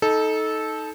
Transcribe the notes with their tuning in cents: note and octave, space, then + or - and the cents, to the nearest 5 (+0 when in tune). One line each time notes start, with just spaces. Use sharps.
D#4 +15 A4 -15